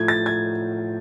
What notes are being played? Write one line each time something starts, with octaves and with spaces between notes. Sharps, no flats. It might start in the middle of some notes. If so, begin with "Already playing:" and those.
Already playing: A2 F3 G#6
A6
G#6